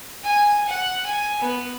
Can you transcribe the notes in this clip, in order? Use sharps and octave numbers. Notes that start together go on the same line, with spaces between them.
G#5
F#5
G#5
B3